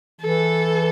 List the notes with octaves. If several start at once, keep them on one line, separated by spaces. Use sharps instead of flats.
E3 A4